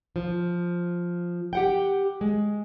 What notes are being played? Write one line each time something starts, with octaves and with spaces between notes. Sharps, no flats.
F3
G4 F#5 G5
G#3